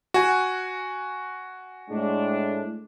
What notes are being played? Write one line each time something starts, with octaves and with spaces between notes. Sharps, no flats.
F#4 G#5
A2 G#3 D4